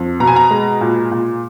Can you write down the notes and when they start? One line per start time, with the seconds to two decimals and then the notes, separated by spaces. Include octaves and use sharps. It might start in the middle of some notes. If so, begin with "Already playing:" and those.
Already playing: F2
0.20 B2 A#5
0.27 G#5
0.36 A#5
0.51 G#3
0.81 A#2
1.11 A#2